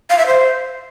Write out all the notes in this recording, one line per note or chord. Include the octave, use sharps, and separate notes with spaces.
F5
E5
C5